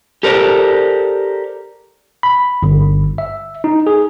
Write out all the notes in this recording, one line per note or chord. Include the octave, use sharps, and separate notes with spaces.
G4 A4 A#4 C5 D5
B5
G1
E5
D#4
G#4